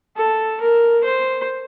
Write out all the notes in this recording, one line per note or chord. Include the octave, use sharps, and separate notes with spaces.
A4
A#4
C5